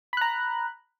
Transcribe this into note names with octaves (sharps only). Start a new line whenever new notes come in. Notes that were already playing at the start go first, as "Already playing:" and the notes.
A#5 B5 F#6